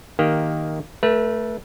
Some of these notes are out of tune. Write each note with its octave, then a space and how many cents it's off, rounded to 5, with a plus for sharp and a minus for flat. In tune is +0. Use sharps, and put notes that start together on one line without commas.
D#3 +0 A#3 +0 G4 +0
A3 +0 B4 -35